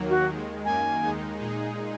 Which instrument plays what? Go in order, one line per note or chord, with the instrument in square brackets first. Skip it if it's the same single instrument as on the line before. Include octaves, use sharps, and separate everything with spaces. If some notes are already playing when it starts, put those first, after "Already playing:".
Already playing: [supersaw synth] D#2 D#3 F#3 A#3
[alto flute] F#4
[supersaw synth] D#2 D#3 G#3
[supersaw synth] F#2 D#3 A#3 [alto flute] G#5
[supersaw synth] D#2 D#3 G#3 D#4
A#2 G#3 D#4 G#4